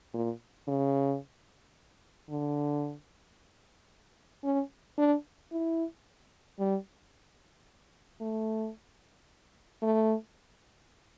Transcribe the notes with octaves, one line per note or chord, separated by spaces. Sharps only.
A#2
C#3
D3
C#4
D4
E4
G3
A3
A3